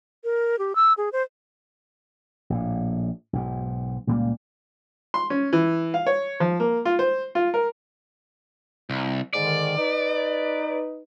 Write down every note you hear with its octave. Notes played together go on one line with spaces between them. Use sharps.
A#4
G4
E6
G#4
C5
A#1 A2
B1 G#2
C#2 A#2 G3 A#3
C6
C#4
E3
F5
C#5
F3
A#3
F4
C5
F4
A#4
C2
G#2 D3 D#3 D5
D#4 B4